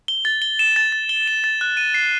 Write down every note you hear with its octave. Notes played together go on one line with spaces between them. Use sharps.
G7
A6
G7
E7
A6
A6
G7
E7
A6
F#6
D#7
C7